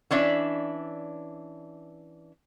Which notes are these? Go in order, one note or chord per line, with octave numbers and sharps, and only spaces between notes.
E3 C#4 D4 D5 E5